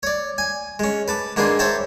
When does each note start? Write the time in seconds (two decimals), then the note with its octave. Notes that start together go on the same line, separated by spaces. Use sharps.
0.03 C#5 D5
0.38 G#5
0.79 G#3 C#4
1.08 B4 A5 D6
1.36 G#2 A#3 D4 G#4 B4 C6
1.59 C5 C#5 E5 G5 A5 A#5